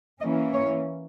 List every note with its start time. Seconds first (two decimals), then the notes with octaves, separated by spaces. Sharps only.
0.21 E3 A#3 C#4 D#5
0.53 C#5